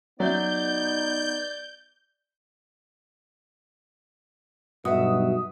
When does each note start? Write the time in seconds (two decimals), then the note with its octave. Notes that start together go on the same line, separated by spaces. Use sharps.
0.20 F#3 B3 D#4 D5 E5 G6
4.85 B1 G2 B2 F#4 E5 D#6